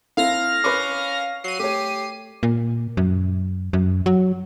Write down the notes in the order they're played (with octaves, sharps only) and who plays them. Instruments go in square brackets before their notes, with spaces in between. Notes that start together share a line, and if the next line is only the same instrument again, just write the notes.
[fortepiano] C4 E4 A4 [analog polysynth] F5 F6 A#6
[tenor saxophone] C#4 [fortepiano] B4 B5 D6
[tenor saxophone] F#3 [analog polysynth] C7 D#7
[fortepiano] A3 C#5 [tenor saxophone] G4
[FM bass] A#2
F#2
F#2
F#3